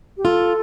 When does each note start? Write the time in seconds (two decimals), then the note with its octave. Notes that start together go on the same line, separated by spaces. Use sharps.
0.17 G4
0.25 F4 A4